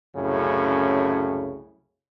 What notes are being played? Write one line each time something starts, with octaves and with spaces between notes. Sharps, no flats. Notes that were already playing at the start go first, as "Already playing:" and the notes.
C2 F#2 A2 C#3